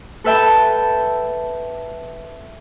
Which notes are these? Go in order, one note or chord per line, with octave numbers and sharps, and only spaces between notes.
A4 B4 E5 G5 A5 B5